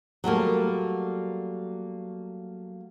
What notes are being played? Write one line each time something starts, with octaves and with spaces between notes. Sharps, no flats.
F#3 G3 A3 A#3